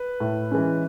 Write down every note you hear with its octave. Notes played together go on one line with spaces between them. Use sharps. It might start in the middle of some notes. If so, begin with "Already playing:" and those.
Already playing: B4
A2
E3 G#3 C#4